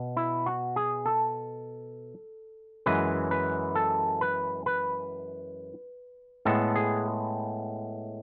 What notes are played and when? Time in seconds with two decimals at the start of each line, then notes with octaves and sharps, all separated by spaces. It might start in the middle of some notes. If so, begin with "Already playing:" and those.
Already playing: B2
0.17 E4
0.46 F#4
0.76 G#4
1.06 A4
2.86 F#2 E3 G#3 B4
3.31 B4
3.75 A4
4.21 B4
4.66 B4
6.45 A2 G#3 B3 A4
6.76 G#4